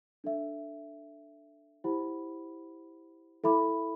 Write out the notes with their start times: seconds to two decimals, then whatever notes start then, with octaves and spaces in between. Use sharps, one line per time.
0.24 D4 A4 E5
1.84 E4 G4 C5 F#5 B5
3.44 E4 A4 E5 B5 D6